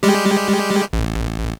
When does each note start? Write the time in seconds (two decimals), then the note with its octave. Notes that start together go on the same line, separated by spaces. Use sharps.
0.03 G3 G#3 G4
0.93 A1